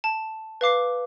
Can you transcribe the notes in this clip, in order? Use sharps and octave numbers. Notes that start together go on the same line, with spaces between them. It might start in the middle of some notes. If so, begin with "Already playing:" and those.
A5
B4 F5 D6 C7